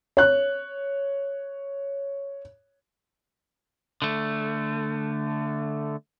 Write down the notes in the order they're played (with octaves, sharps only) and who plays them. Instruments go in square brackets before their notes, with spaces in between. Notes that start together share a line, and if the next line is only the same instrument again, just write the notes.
[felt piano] C#5 F#6
[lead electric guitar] D3 A3